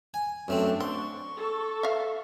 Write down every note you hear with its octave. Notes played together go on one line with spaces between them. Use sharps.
G#5
F#2 A3 C4 D4
C4 C6 C#6
A4
E5 F5